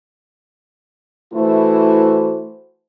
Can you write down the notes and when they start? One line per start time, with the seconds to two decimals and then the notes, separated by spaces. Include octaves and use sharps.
1.33 E3 A3 E4 F#4 C5